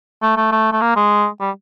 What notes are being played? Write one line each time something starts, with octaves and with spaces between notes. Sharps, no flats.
A3
A3
A3
A3
A#3
G#3
G3